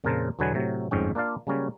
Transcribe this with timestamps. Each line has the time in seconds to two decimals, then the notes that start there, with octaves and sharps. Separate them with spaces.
0.04 F2 A#2 C#3 A#4 C5 A5
0.39 E2 B2 D3 F#3 B4 G#5
0.54 A2 C3 F#3
0.91 G1 F2 G#2 C#4 G5
1.15 A#3 D4 F4 D5 F5
1.47 C#3 F#3 G3 A#3 C#4